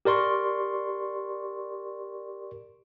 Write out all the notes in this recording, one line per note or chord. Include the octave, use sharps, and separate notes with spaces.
G4 A#4 D5 C6 C#6